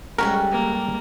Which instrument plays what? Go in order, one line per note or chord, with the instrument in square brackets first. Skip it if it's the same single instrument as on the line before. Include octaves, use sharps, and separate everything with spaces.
[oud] G3 G#3 C#4 [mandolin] G4 A4 F#5 [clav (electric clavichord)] A#4
[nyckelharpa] A#3